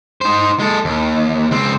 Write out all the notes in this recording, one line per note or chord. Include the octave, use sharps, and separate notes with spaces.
D#4 C5
G#3 A4
D#2
C#2 C4